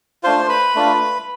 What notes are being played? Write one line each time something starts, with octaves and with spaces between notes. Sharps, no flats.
A3 D4 F4 C5 C6
B4 B5
A3 D4 F4